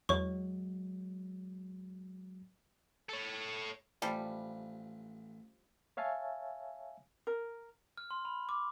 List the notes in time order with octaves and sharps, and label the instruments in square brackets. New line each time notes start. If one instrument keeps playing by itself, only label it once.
[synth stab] E2 [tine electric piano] F#3 G#3 [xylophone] C#5 C#6
[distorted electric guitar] A4 C#5
[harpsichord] A1 [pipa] F3 G3
[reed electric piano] C#5 E5 F5 G#5 A5
[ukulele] A#4
[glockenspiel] F6
C6
B5
D6